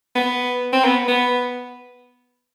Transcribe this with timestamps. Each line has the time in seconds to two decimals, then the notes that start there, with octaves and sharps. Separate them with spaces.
0.16 B3
0.73 C4
0.85 B3
1.08 B3